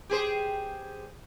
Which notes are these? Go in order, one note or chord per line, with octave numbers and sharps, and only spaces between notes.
G4 G#4 C5